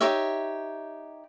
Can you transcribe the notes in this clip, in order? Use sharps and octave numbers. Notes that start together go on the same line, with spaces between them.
D#4 G4 C#5 E5